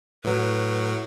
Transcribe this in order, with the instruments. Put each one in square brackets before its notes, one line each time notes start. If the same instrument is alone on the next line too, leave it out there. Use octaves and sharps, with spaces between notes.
[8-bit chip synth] A2 F#3 [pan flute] B4